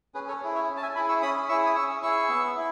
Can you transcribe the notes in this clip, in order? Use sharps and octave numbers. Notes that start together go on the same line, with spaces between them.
C#4 G#4 B4
A4 C#5
E4 G#4
C#5 E5
C#4
A5
E5 G#5
E4 G#4 G#5 B5
C#6 E6
C#4 B5 D#6
E4 G#4 C#6 E6
D#6
C#4 C#6 E6
E4 G#4 C#6 E6
B3
E4